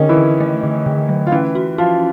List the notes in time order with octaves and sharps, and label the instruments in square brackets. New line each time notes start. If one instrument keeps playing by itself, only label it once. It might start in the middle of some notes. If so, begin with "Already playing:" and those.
Already playing: [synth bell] D3 A3 [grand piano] D#3 C#4 D#4
[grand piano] E3 E4
[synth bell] D3
A3
D3
D3
F#3
[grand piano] F4
[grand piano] E3 E4 [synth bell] C#4
[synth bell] F#4
[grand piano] F3 F4 [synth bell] F#4